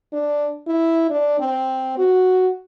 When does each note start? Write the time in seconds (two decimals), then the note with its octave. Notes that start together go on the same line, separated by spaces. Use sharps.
0.13 D4
0.67 E4
1.10 D4
1.39 C4
1.98 F#4